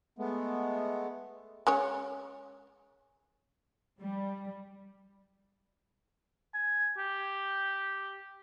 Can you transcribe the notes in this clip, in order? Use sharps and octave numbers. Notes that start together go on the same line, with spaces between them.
G#3 A3 B3
G#3 C#4 C#5
G3
G#5
G4